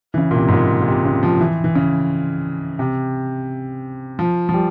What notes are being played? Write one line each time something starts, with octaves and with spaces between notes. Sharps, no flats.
E3
C#3
A#2
C3
G#2
A#2
A#2
C3
C#3
F3
E3
E3
C#3
C3
F3
F3
G3